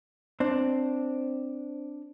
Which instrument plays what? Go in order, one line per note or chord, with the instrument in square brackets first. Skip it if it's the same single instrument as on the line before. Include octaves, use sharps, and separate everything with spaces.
[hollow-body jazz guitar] C4 D4